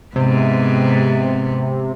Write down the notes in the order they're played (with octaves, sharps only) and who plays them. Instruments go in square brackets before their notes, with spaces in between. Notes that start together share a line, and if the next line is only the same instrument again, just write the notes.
[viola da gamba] G#2 B3 [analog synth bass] C3